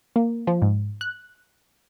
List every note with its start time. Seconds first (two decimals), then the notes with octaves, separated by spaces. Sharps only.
0.16 A#3
0.47 F3
0.62 G#2
1.01 F#6